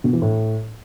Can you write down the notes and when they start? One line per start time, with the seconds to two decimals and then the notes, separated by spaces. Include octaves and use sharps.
0.04 B2
0.13 E3
0.22 A2